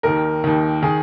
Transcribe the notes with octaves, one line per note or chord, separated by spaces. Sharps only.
D#2 D#3 A#4
D#2 D#3
D#3 G#4